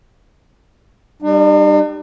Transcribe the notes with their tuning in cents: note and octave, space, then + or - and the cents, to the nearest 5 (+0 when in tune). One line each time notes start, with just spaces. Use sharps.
G3 +0 D4 +45